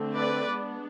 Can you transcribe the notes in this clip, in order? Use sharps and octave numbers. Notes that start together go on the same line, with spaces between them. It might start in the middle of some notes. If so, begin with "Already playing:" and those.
Already playing: D3 A3 C4
B4 D5
G#3 B3 D4